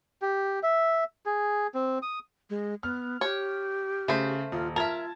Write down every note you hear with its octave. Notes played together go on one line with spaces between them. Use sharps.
G4
E5
G#4
C4
D#6
G#3
B3 F6
G4 C#5
C#3 A3 C5
D#1 F4
F4 A#4 E5 A5 G#6